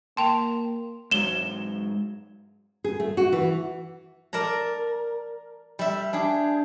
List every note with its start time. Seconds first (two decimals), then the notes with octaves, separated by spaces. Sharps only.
0.17 A#3 G5 A5 C6 F7
1.11 G#2 F#3 E7 G7
2.84 G#4
3.00 A3
3.17 F#4
3.32 E3
4.33 A#4 D5 A5 A#5
5.79 G3 E5
6.13 D4 G4 G#4